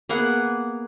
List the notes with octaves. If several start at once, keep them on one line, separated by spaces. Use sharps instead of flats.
A#3 B3 G#4 F#5